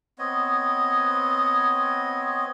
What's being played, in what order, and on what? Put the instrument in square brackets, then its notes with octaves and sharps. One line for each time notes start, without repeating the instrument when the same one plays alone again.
[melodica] B3 C4 C#5 D#5